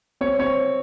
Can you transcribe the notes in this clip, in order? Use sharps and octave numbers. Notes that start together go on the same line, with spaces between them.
C4 C#5
C4 C#5